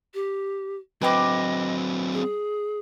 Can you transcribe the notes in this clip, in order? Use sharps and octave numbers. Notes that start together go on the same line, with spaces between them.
G4
F#3 C4 B4 D#5 G5 D6
G#4